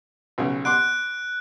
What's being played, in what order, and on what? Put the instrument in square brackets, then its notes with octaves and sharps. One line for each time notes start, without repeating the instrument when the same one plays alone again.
[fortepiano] B1 C#3 B3
[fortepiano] F#5 C6 D6 [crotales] F#6 D7